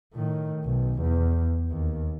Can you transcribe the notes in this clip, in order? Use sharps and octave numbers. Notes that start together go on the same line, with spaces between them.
A2 D#3
B1
E2
D#2